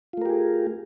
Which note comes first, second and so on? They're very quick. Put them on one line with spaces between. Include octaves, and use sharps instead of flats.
F4 A3 A#4 G4 G#4